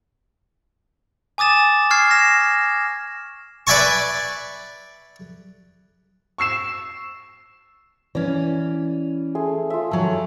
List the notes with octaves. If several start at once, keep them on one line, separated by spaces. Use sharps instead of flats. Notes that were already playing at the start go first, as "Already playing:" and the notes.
G#5 D6 D#6 A6 E7
C#6 F6 G#6 C7
A#6 E7
B4 D5 E5 G#5 A5 C#6
C#6 E6 C7 E7
E3 C#4 D5
A3 G#4 C6
F4 E5
D#3 F#3 A4 F5